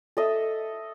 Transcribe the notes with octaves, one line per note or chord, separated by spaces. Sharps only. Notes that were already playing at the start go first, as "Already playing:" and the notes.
A4 D#5 E5